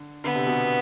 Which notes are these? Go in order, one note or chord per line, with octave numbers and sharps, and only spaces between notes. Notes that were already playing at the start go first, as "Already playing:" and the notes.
Already playing: D3
D3 B3
C3
B2